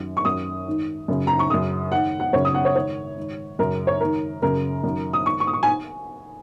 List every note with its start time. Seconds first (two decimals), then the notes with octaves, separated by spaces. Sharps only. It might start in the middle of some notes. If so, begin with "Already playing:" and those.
Already playing: F#2 D#3
0.17 C#6
0.25 F#2 D#3 D#6
0.67 G#2 D#3
1.08 F#2 C#3
1.27 A#5
1.39 C#6
1.50 F#2 C#3 D#6
1.92 G#2 D#3 F#5
2.20 F#5
2.33 F#2 C#3 C#5
2.45 D#6
2.55 F#5
2.65 C#5
2.75 G#2 D#3 C#5
3.18 G#2 D#3
3.59 F#2 C#3 A#4
3.87 C#5
4.00 G#2 D#3 A#4
4.42 F#2 C#3 A#4
4.84 F#2 D#3
5.13 D#6
5.26 G#2 D#3 C#6
5.40 C#6
5.47 D#6
5.53 C#6
5.63 G#5